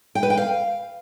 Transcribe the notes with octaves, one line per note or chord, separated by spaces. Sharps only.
G5
B4
G5
F5